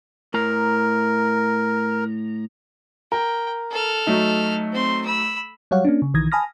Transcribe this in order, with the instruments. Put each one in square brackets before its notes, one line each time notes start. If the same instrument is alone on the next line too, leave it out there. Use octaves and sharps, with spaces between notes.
[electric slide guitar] A2 A#5 [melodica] A#4
[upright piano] A#4 [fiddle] G5
[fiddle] A4 F6
[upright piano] F#3 A3 D#4
[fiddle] C4 C6
B5 E6
[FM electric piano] F#3 G3 C#5 F5 F#5
A#3 C#4 D4
C#3
B1 D#3 E3 D#6 G#6 A#6
G#5 A5 B5 D#6 F6 A#6